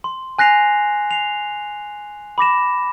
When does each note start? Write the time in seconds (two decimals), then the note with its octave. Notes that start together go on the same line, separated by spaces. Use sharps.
0.04 C6
0.39 G#5 F#6 A#6 C7 F7
1.11 C7 F7
2.38 B5 D6 A#6 E7